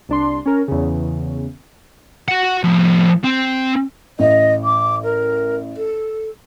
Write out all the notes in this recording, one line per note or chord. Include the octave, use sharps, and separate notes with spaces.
C2 D4 C6
C#4 A#4
E2 C#3
F#4 F#5
A2 F3
C4
A1 D#5
D6
A#4
A4